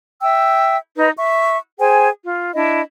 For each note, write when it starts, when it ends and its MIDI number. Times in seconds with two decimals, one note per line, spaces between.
0.21 0.77 76
0.21 0.77 79
0.21 0.77 88
0.96 1.09 63
0.96 1.09 71
0.96 1.09 75
1.17 1.57 76
1.17 1.57 85
1.78 2.08 68
1.78 2.08 72
1.78 2.08 79
1.78 2.08 80
2.24 2.53 65
2.54 2.81 62
2.54 2.81 64
2.54 2.81 75